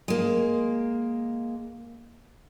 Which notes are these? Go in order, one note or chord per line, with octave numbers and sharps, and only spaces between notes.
G#3 A#3